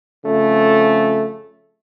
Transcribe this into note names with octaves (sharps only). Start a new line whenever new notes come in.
F2 C#3 A3